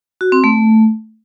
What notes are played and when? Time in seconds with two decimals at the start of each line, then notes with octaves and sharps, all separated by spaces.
0.21 F#4
0.32 C4
0.44 A3